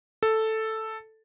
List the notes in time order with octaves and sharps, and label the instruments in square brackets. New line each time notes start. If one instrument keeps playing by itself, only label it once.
[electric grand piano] A4